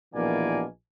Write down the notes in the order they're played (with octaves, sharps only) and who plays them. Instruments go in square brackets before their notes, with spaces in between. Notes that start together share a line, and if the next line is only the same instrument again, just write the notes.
[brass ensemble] A#1 B2 E3 A#3 D5 G#5